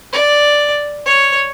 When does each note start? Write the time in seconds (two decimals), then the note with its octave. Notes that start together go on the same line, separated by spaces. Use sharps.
0.13 D5
1.06 C#5